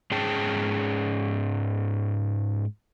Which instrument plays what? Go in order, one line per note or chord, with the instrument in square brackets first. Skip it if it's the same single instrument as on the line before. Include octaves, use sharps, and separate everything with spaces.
[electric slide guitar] G#2 C#4 G#4 G5 A5